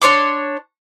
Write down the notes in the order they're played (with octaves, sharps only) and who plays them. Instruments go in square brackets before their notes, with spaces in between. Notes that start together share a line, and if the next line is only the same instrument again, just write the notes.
[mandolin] D4 C#5 C6 D6